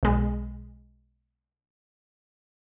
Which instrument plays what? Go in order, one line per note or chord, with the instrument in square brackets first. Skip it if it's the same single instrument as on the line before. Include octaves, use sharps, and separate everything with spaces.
[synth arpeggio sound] B1 G#3